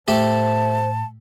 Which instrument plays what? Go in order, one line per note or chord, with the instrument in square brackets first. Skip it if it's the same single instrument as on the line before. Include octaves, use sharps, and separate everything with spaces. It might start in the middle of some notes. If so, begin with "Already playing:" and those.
[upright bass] A2 [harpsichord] A3 G4 A4 [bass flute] C5 [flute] A5